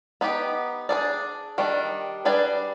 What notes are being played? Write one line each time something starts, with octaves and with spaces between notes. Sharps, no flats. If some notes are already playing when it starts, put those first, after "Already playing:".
B3 D#4 G4
D4 G#4 D5
D#3 G3 D4
G3 D4 G#4 B4 D5